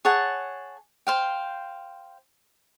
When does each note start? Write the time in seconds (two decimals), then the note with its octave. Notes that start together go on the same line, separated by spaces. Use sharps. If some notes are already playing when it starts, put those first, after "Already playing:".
0.05 G#4 C#5 F#5 A5
1.07 C5 F5 G5